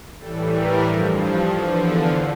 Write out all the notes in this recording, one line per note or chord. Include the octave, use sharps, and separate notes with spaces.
A2 E3 G3 A4
A#4
G2 F3
E2 D3 F3 C#5
D5